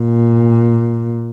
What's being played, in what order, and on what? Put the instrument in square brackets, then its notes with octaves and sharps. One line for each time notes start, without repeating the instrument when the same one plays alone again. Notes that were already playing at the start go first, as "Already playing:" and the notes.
Already playing: [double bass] A#2